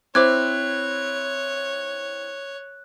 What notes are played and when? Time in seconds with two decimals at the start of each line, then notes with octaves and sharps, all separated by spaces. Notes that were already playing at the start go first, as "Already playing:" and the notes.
0.15 C4 E4 C5 C#5 D6 F#6 G#6